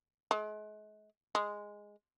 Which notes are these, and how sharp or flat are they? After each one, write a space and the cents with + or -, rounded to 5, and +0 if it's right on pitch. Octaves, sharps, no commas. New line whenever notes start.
G#3 +40
G#3 -5